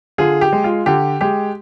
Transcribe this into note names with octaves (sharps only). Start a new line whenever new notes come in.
D3 F4 G#4
G4
G#3
F4
D3 G4
G#3 G4